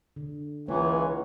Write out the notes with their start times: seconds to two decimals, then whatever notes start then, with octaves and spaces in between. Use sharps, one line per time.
0.16 D3
0.68 C#2 E3 G#3 A#3 C#5